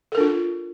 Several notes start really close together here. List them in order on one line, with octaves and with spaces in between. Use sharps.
A4 A#4 D4 F4